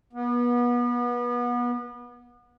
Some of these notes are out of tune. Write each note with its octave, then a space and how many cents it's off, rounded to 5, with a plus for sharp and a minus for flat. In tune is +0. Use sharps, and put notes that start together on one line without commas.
B3 -30